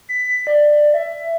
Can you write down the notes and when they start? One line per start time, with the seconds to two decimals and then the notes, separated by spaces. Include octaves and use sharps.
0.09 B6
0.47 D5
0.94 E5